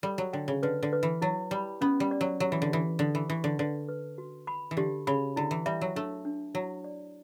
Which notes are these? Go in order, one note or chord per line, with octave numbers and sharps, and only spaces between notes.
G3 A4
F#3
D3 G5
C#3
D3 B4
D3
B4
E3
F#3 E4
G3 B5
B3 C#4
G3
D5
F#3
F#3 G4
E3
D3
E3 G4
D3 A4
E3
E3 C#6
D3
D3 B4
B4
F#4
B5
E3
D3 G4
C#3 B5
D3 E4
E3
G3 E5
F#3
A3 D4
D4
F#3 E4
D5